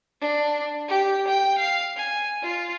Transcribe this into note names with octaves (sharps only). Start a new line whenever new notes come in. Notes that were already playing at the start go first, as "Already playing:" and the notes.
D4
G4
G5
F5
G#5
F4